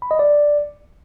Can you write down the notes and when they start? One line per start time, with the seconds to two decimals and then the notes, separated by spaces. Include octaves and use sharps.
0.02 B5
0.11 D#5
0.19 D5